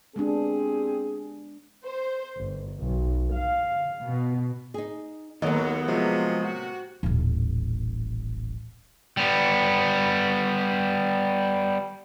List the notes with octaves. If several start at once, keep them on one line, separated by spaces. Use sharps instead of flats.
G#3 B3 C4 D4 G4 G#4
C5
G1
B1
F5
B2
D#4 G#4
D#2 F#3 A#3 B3 A4 D#5
C3 F3 F#3 G#3
F#4
D#1 A1
G3 B3